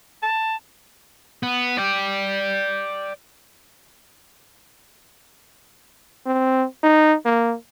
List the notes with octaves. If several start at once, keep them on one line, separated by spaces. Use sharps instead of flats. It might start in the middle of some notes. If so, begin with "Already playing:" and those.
A5
B3
D5 G5
C4
D#4
A#3